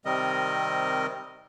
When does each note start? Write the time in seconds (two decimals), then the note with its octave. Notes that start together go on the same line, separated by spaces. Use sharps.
0.05 C3 D#3 G3 C4 A#4 D#5